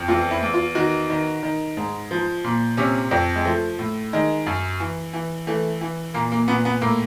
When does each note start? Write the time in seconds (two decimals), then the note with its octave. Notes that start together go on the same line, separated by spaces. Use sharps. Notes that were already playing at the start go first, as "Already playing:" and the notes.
Already playing: F2
0.08 E2 F4
0.31 E4
0.42 E2
0.54 F4
0.75 D#3 F#4
1.10 D#3
1.43 D#3
1.77 G#2
2.11 F3
2.44 A#2
2.77 C3 C#4
3.11 F2
3.35 G#3
3.45 F3 A3
3.79 A2
4.13 D#3 G#3
4.46 F#2
4.80 E3
5.13 E3
5.47 E3 A3
5.81 E3
6.14 A#2 A#3
6.32 A#3
6.48 A#2 B3
6.65 B3
6.81 A2 A#3